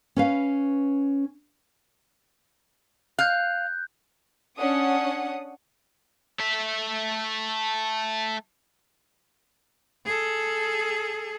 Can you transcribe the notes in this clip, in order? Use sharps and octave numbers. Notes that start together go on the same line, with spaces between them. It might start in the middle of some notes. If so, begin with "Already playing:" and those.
C#4 B4 F5
F5 F#6 G6
C#4 D4 F#5 D#6
A3 E5
G#4 A4